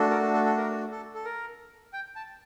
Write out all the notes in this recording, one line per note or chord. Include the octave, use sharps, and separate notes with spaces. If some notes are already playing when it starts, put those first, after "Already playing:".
Already playing: A3 D4 F#4 A4
A#4
A4
A4
A#4
A4
A4
A#4
G5
A5